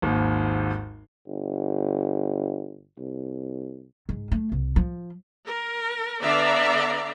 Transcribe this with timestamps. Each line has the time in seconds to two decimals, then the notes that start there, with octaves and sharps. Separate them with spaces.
0.02 G#1 D#2 G#2
1.27 G1
2.98 C2
4.09 G#2
4.32 A3
4.52 C2
4.76 F3
5.46 A#4
6.22 D3 B3 D5 E5 F5 A#5